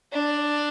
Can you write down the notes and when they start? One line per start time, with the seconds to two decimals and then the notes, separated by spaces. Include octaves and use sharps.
0.12 D4